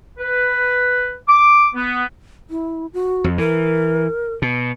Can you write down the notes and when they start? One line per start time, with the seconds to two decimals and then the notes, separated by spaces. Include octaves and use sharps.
0.18 B4
1.28 D6
1.75 B3
2.50 E4
2.93 F#4
3.24 F2
3.38 E3 A#4
4.42 B2